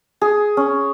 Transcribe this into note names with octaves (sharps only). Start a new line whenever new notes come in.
G#4
C#4